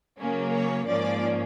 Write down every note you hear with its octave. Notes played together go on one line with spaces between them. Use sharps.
C#3 F#3 A#3 C#4
C#5
G#2 F3 A#3 C#4 D5